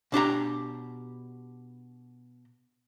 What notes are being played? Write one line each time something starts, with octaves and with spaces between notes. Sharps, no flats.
B2 D4 G4 A#5